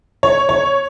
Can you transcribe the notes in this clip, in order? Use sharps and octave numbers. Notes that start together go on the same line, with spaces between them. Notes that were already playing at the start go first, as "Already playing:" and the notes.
C#5
C#5